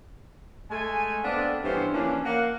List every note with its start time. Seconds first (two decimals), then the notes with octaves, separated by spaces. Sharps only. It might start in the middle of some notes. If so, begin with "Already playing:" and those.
0.71 G#3 A3 G#5
1.24 B3 C4 D4 A4 D5 F5
1.63 G2 C#3 E3 B3 C#4 C5
1.94 E3 F3 A#3 C#4 D4
2.24 A#3 F#5